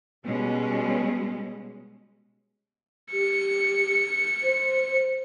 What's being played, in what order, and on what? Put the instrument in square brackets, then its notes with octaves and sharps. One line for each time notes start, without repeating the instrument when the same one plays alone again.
[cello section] B2 G3 G#3 C#4
[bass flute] G4 [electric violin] C#7
[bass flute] C5